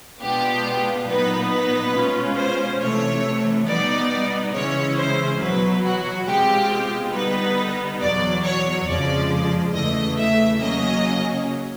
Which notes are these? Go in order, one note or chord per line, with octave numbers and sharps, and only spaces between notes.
B2 G#3 B3 D4 F4 G4
A#2 F#3 B3 D#4 B4
B4
B2 G#3 C#4 F4
C5
C3 E3 A3 C#5
B2 G3 B3 D#4 D5
C#3 E3 G#3 C#4 E4 C#5
C5
E2 B2 F#3 B4
F#4
B2 G#3 C4 F4 G4
D3 G3 B3 D#4 B4
E2 B2 F#3 D5
C#5
F2 C#3 F3 G#3 D5
E2 C#3 E3 A3 D#5
E5
C#3 F#3 A#3 C#4 D#5